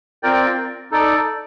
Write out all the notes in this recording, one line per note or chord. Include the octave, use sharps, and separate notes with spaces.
C4 F4 A#4 D5 G5
D#4 A4 D5